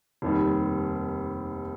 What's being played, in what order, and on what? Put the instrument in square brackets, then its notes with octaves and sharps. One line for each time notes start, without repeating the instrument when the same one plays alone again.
[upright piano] F1 D#2 D#3 G3